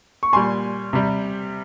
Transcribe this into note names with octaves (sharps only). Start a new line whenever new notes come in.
C#6
A#2 G3 G#5 C6
C3 G3